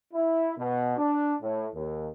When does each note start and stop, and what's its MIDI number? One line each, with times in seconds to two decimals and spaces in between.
0.14 0.52 64
0.58 0.95 47
0.97 1.35 62
1.42 1.68 45
1.74 2.09 39